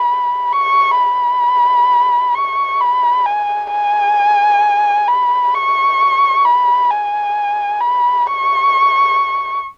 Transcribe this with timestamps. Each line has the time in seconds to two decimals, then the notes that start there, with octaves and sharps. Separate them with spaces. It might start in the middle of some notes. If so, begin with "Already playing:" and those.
Already playing: B5
0.53 C#6
0.98 B5
2.35 C#6
2.80 B5
3.26 G#5
3.71 G#5
5.08 B5
5.54 C#6
6.45 B5
6.91 G#5
7.81 B5
8.27 C#6